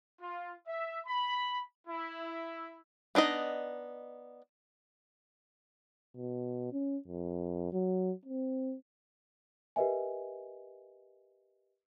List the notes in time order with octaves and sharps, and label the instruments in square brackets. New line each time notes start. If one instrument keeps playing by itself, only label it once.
[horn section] F4
E5
B5
E4
[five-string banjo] B3 D4 D#4 D#5
[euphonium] B2
C#4
F2
F#3
C4
[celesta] G4 A#4 B4 D#5 E5 G#5